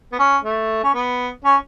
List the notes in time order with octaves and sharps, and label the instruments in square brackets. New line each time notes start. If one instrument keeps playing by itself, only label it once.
[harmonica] B3
C#4
A3
C#4
B3
C#4